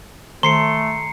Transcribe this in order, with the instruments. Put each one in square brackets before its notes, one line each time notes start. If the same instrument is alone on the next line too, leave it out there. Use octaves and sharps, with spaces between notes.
[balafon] D#3 [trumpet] A3 [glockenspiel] A#5 C7 C#7 [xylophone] C6